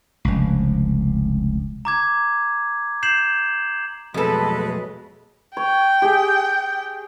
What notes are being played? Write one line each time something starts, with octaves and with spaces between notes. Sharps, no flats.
F1 C#2
A#5 D6 G#6
G6 C7 E7 F#7
F2 B2 F#3 G#3 A3 A4 B4
C#5 G5
G4 G#4